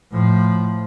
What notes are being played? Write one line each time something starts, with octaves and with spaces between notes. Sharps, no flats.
A2 F3